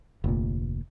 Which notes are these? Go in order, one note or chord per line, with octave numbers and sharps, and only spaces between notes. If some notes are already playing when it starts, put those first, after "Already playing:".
F1 D2 A#2